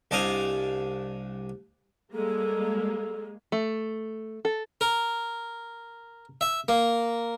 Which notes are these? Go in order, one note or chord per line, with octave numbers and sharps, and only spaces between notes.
C2 D4 D5 D#5 F5 G#5
G3 G#3 A#3 A4
A3
A4
A#4
E5
A#3